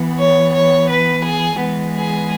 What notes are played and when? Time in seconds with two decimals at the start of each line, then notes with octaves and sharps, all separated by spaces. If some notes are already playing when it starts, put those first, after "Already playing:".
Already playing: E3 B3
0.18 C#5
0.53 C#5
0.89 B4
1.24 G#4
1.59 E3 G#3 B3
1.95 G#4